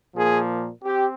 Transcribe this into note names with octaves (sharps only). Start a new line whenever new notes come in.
A#2 F3 A#3 G#4
C4 G4